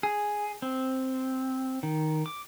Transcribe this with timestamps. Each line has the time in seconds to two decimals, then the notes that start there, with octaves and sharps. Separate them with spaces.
0.03 G#4
0.62 C4
1.83 D#3
2.26 D6